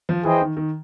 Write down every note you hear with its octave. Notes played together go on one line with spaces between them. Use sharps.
F3
E3 E4 G#4 C5 D#5 G5
D#3
D#3